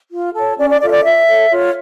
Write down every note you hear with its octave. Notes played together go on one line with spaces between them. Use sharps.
F4
A4 C#5
C#4 D5
D5
F4 A4 D5
E5
D5
F4 E5
A4 C#5
F4 C#5